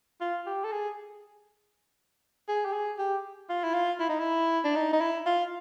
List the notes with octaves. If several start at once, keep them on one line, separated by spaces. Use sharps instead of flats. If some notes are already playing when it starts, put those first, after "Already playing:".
F4
G4
A4
G#4
G#4
G4
G#4
G4
F4
E4
F4
E4
D#4
E4
D4
D#4
D#4
E4
F4